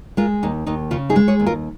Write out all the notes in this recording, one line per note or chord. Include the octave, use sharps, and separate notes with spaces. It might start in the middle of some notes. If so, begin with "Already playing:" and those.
G#3 F4 A#4
D#2 D#4
D#2 D#4
C#3 C#4 F4
D#4 G#4
G#3
G#4 C#5
D#2
F4 A#4